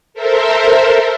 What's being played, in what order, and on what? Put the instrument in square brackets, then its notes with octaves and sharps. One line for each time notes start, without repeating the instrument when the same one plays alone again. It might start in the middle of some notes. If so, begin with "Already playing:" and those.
[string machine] A4 A#4 C5 E5